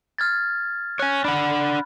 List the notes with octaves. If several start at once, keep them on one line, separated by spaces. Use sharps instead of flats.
F6 G#6 A6
C#5 G#5 F#6
D4 F#5 B5